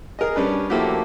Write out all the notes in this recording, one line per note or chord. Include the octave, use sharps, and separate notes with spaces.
G#4 A#4 D#5
G3 C#4 D4 B4
F3 A3 A#3 E4 F#4 G4